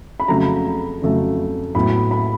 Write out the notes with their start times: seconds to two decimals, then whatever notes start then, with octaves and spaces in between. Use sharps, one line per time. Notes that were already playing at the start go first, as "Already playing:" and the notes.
0.20 B5
0.28 F2 C#3 F#3 A3 A#5
1.02 F2 C#3 F#3 A3
1.75 A2 F#3 B3 B5
2.11 B5